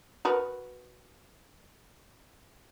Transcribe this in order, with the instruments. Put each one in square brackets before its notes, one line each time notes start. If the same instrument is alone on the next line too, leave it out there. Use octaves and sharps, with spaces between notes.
[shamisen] F#4 A#4 B4